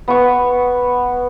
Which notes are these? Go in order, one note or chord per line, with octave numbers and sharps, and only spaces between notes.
B3 C#6